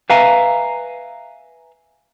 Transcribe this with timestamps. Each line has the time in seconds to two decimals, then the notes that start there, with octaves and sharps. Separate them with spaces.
0.10 B4 E5 F5 G#5 A#5